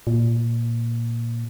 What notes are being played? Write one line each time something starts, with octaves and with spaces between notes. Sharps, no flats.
A#2